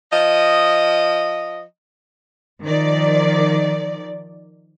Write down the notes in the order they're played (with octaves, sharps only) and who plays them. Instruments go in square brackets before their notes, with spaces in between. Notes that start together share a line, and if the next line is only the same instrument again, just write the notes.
[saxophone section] F3 D#5
[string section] D#3 F3 D5